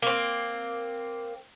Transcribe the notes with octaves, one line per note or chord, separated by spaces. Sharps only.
A#3 C4